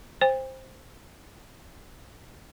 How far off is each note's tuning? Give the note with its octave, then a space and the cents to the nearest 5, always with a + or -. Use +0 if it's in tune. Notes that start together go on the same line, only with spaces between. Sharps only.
C5 +10 G5 +40